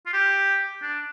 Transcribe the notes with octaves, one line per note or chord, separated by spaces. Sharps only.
F4
G4
D4